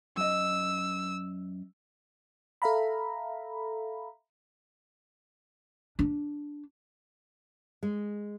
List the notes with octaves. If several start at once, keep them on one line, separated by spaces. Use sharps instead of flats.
F#2 D#5 E6
A4 E5 F5 A#5 B5
D4
G#3